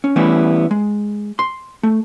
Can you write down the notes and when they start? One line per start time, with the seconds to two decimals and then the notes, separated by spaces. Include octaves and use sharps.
0.04 C#4
0.16 E3 G3 A3 B3 C#4 E4
0.71 G#3
1.39 C6
1.83 A3